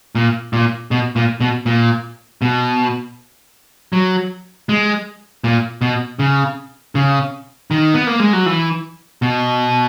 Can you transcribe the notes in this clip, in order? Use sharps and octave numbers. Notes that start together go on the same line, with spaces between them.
A#2
A#2
B2
A#2
B2
A#2
B2
F#3
G#3
A#2
B2
C#3
C#3
D#3
B3
A#3
G#3
F#3
E3
B2